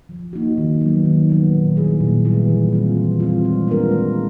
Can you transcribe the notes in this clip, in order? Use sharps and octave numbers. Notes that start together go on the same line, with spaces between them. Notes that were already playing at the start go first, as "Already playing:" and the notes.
F3
A#3 D#4 F#4
D#3
F#3 B3
D#3
F#3 B3
A#2
G3 B3 E4 G#4
A#2
G3 B3 E4 G#4
E3
G3 C4 F4
E3
G3 C4 F4
G#3
B3 D4 F4 A#4
G#3